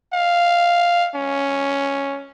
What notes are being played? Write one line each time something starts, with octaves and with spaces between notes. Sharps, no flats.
F5
C#4